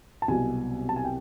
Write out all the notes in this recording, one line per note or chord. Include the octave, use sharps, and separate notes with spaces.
A5
C2 B2 F#3 G#5
A5
G#5
G5